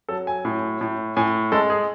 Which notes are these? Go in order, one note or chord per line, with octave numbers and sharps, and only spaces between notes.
F#3 A4
G#5
A2
A2
A2 G#5
G#3 A4
G#4